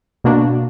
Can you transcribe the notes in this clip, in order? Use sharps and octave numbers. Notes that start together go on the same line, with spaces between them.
B2 A#3 D4 F#4